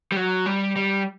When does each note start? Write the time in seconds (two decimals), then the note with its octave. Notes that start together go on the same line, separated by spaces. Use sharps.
0.12 G3
0.16 F#3
0.46 G3
0.76 G3